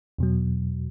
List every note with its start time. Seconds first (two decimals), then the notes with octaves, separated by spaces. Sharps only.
0.18 E2 B2 F#3